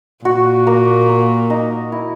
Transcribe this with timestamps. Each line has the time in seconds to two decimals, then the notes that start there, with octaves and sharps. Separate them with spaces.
0.25 A#2 F#4
0.67 A#3
1.09 A#3
1.50 D#4
1.92 E4